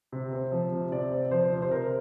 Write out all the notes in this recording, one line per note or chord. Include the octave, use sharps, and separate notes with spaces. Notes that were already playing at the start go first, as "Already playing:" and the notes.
C3
C4
F3
C3
C3 D5
C4
F3 C5
C3
C5
C3 A#4